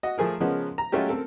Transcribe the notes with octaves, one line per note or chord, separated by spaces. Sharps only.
F#4 D#5
F3 A3 G#4 A#4
C#3 F3 G#3 B3 C#4 A#4
A#5
F#3 G#3 A3 C#4 F4 G4
C4 A4 A#4